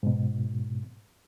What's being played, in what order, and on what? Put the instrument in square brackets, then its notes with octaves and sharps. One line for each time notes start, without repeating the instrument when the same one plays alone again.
[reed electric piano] G#2 B2